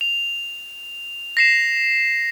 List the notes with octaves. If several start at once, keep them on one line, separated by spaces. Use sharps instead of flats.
F7
A#6 C7 E7